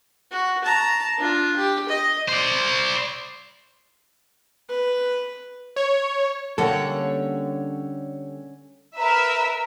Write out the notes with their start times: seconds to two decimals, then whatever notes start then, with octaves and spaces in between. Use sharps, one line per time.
0.31 F#4
0.64 A5 A#5
1.18 D4 F4
1.56 G4
1.88 D#5
2.29 C5 D5
4.69 B4
5.76 C#5
6.58 D3 G3 A#3 C#4 A4 C#5 F#5
8.98 A#4 B4 E5 A#5